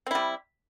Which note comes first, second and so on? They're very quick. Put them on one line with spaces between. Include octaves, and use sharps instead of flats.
C4 E4 G3